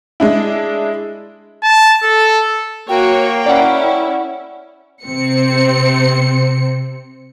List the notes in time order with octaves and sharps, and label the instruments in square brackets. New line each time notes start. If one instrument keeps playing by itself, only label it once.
[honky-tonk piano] G#3 D4 E4
[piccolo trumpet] A5
A4
[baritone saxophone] A#3 [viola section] F#4 C#5 [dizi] G5
[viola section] C#4 E4 [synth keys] D5 F#5
[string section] C3 C4 C#7